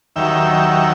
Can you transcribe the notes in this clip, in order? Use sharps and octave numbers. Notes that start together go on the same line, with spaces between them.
D#2 D#3 F#3 E5 G5